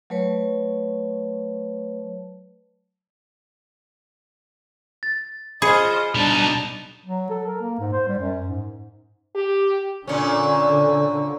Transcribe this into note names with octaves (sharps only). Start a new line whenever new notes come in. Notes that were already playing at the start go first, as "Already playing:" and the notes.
F#3 A3 B4 C#5 A5
A6
F4 G#4 C5 D#5 B5 C#7
B2 G3 D4 D#4 A5
F#3
A4
A#4
A#3
G#2
C5
G3
F#2
G#2
G4
A#2 D3 C#4